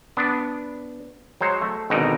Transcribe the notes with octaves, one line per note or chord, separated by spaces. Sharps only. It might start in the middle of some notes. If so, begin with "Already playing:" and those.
B3 D4
F#3 G#3 C5 C#5
A3
G#1 B2 D3 D#4 G5 A#5